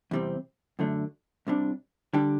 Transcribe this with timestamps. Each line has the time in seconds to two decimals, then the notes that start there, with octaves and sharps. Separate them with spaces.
0.11 E2 C3 G3 C4
0.79 F#2 D3 A3 D4
1.47 C2 C3 G3 D4
2.13 D3 G3 D4 G4